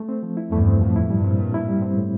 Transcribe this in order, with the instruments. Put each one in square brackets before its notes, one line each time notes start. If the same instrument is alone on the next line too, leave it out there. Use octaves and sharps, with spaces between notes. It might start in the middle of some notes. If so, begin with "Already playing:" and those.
Already playing: [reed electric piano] A3
C4
F3
E4
[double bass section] E2 G2 [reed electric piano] A3
[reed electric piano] C4
[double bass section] F2 A2 [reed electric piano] F3
[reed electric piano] E4
[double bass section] G2 A#2 [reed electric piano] G3
[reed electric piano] C4
A2
E4
G3
C4
A2